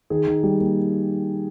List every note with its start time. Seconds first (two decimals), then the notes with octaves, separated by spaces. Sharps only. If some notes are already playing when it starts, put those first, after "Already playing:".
0.10 D#3 G#4
0.27 D#3
0.43 G3
0.60 A#3